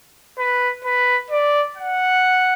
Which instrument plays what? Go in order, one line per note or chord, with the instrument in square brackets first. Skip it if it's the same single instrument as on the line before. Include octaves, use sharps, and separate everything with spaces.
[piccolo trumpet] B4
B4
D5
F#5